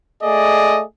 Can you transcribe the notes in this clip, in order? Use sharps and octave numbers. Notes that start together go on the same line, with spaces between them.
A3 G#4 D5 D#5